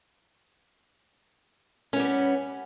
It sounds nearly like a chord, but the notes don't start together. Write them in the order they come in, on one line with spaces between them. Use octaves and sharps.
C#4 B3 G3